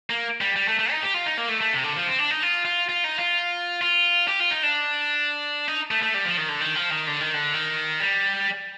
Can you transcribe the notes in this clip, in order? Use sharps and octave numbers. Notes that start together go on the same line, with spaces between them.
A#3
G3
G3
A3
A3
D#4
G4
F4
D#4
A#3
A3
A3
C3
D3
F3
C4
D4
D#4
F4
F4
F4
D#4
F4
F4
G4
F4
D#4
D4
D#4
A3
A3
G3
F3
D#3
D3
D#3
F3
D#3
D3
D#3
D3
D#3
G3